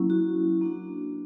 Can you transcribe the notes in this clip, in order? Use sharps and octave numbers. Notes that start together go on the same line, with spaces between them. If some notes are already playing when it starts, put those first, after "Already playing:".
Already playing: F#3 A#3 C#4 E4
F#4
A#3 D4 F#4